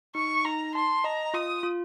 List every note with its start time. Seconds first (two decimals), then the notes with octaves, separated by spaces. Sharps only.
0.15 D#4 C#6
0.44 D#4 A#5
0.75 A5 C6
1.04 D#5 A#5
1.34 F4 D#6
1.63 F4